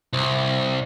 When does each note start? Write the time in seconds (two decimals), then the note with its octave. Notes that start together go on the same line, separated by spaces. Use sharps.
0.13 C2